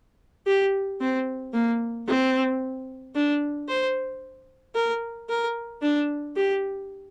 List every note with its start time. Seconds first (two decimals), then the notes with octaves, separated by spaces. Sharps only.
0.47 G4
1.01 C4
1.53 A#3
2.08 C4
3.15 D4
3.68 C5
4.75 A#4
5.29 A#4
5.82 D4
6.36 G4